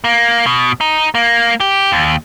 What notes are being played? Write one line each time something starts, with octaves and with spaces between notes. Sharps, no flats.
A#3
B2
D#4
A#3
G4
D#2